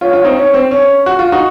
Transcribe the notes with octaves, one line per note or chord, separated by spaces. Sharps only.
C#4 F4
C#4 F4
C4 D#4
C#4
C4
C#4
F#4
F4
D#4 F#4